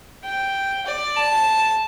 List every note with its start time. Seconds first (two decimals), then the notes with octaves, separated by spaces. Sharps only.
0.24 G5
0.86 D5
1.16 A5